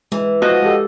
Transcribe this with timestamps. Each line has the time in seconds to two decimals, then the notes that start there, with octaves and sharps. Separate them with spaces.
0.12 E3 G#3
0.42 F3 F#4 D#5
0.62 G#3 G4 A4